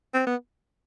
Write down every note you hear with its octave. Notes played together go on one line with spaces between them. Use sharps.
C4
B3